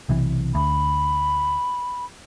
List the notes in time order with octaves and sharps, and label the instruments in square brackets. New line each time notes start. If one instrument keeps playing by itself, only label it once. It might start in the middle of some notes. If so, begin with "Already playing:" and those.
[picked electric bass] B1 C3 E3
[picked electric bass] D2 [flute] B5